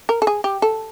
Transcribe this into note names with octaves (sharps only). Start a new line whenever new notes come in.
A#4
A4
G#4
G4
A4